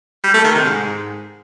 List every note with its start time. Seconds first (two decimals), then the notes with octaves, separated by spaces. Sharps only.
0.24 G3
0.34 A3
0.44 D#3
0.55 C3
0.65 G#2